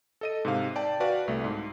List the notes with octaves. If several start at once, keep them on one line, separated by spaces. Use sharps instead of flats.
A4 D#5 D#7
G#2 C3 F5
D5 G5 A5
F#4 B4 D5 F5
C2 A3
G#2